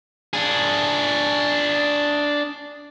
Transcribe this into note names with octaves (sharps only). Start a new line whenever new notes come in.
D4 G#4